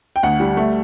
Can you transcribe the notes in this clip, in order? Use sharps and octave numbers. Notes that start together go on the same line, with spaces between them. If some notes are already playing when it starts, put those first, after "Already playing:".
G5
D2 F#5
G3
A3